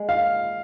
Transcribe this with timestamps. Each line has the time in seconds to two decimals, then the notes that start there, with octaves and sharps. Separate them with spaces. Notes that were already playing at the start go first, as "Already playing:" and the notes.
Already playing: G#3
0.09 F5